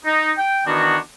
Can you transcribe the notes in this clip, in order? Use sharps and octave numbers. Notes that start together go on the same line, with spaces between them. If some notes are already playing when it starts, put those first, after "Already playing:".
D#4
G5
D#3 E3 B3 D4 F#4